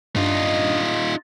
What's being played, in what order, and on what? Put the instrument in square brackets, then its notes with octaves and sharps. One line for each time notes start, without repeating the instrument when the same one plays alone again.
[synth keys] G2 D4 [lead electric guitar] D#4 F4 [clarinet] D#5